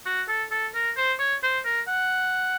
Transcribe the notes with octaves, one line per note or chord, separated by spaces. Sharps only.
F#4
A4
A4
A#4
C5
C#5
C5
A#4
F#5